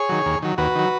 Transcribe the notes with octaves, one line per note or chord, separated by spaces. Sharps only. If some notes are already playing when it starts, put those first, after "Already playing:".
Already playing: G#4 C#5
D#3 F#3
D#2
D#3 F#3
D#2 F#4 B4
D#3 F#3